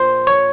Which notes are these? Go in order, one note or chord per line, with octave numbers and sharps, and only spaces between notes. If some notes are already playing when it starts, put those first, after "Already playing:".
Already playing: A#1 A#2 C5
C#5